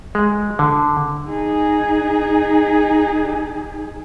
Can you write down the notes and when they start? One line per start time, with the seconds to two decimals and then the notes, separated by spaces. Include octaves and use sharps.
0.15 G#3
0.59 D3
1.28 D#4 G#4